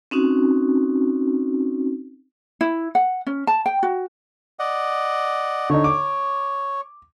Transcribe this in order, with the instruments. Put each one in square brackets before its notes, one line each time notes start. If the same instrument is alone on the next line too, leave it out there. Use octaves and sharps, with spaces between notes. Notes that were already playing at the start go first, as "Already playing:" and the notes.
[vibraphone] C4 C#4 D#4 F#4
[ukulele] E4
F#5
C#4
A5
G5
F#4
[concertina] D5 D#5 F#5
[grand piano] D3 D#4 [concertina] C#5
[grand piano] D6